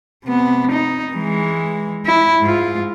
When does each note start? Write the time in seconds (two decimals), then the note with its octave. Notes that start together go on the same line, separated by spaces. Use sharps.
0.24 C3 B3
0.72 D#4
1.14 E3 G#3
2.06 E4
2.41 G#2 F4